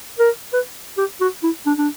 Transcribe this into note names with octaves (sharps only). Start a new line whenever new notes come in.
A#4
B4
G4
F#4
E4
D4
D4